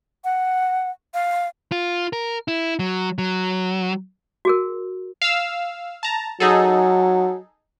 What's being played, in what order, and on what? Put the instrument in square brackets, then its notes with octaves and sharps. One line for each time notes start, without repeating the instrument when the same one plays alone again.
[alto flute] F#5
F5
[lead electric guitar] F4
A#4
E4
F#3
F#3
[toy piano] F#4 G#4 A#4
[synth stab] F5 E6
A5 A#5
[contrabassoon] F#3 [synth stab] D#4 G#4 A4